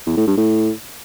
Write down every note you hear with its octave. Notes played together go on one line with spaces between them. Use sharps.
E2
A2
G2
A2